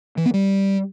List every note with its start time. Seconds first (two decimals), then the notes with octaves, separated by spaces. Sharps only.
0.17 E3
0.25 B3
0.34 G3